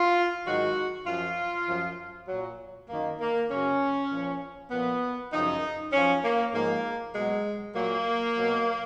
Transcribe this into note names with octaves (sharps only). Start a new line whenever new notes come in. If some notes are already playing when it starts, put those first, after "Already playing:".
Already playing: F4
G#2 D#3 F#3 F#4
F#2 F3 F4
F#2 F3
A#2 F#3
F#2 D#3 F#3 A#3
A#3
F#2 C#3 F#3 C#4
A#2 F3
A#2 F3 B3
F#2 C#3 F3 D#4
F#2 F3 C#4
A#3
G#2 F3 A#3
B2 F#3 G#3
A#2 F#3 A#3
B2 F#3